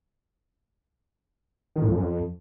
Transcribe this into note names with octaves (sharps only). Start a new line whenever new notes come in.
D#3
A2
F2
F#2
F2